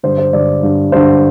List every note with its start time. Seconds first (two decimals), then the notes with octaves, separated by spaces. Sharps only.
0.03 G2 D3 C5
0.18 C5
0.33 G2 D3 D5
0.63 G2 D3
0.92 G2 D3 C5